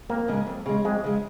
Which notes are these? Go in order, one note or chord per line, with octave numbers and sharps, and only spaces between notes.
F2 A#3
C#3 G#3
F2
C#3 G#3
F2 G#3
C#3 G#3